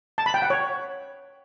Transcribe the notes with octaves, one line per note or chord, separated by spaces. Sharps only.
A5
B5
G5
F#5
C#5